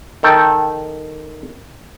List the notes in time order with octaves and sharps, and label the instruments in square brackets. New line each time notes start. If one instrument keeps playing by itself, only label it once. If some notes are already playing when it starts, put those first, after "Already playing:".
[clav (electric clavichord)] D#3 A4 G5